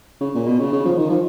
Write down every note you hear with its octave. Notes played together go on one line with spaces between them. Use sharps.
C#3
A#2
B2
C#3
C#3
F3
D#3
F3